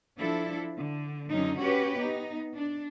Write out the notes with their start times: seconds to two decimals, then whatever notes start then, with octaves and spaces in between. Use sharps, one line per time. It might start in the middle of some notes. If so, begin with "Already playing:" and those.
0.17 F3 D4 E4 A4
0.77 D3
1.30 F#2 D3 F#3 C#4 D#4
1.60 C#4 F#4 G4 B4 C#5
1.98 B3 D#4
2.54 D4